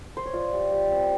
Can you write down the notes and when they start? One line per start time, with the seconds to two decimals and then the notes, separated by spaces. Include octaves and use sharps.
0.17 C5
0.26 C#5
0.33 F4 D5
0.53 G3
0.72 G3
0.91 C4